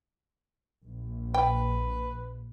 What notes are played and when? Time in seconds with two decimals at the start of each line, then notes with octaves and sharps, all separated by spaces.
0.84 A#1
1.34 B4 G5